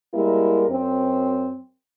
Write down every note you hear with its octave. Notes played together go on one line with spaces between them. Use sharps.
G3 G#3 A#3 E4 A#4
F#2 C4